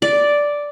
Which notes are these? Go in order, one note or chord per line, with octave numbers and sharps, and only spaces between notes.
D5